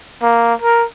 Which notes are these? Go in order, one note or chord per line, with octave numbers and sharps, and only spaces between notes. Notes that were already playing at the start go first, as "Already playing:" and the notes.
A#3
A#4